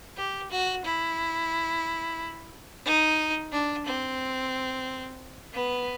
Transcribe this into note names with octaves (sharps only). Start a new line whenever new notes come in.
G4
F#4
E4
D#4
D4
C4
B3